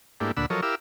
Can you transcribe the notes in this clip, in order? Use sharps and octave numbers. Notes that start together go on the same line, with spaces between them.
G#2 A3 A#3 D4 E4 G4
D2 A#2 D4 F#5 B5 E6
F3 F#3 A4 A#4 C#5 D#5
E4 G4 A#4 F5 D6 E6